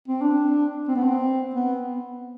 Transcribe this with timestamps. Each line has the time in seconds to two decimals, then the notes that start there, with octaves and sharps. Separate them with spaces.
0.08 C4
0.21 D4
0.88 C4
0.96 B3
1.04 C4
1.55 B3